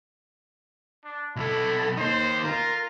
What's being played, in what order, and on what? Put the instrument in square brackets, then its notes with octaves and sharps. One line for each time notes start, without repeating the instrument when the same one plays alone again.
[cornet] D4
[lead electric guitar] B1 A4 [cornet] E4
[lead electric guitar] A#3 D#4 [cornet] C5
[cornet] F4 [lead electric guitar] A#4